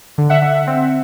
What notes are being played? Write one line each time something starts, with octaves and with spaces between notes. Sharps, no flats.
D3
E5 F#5
D3
C4